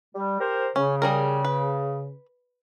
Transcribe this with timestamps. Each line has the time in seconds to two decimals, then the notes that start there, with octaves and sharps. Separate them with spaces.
0.15 G3
0.40 G4 A#4 C5
0.76 C#3 C#4
1.02 G3 G#4 A#4
1.45 B4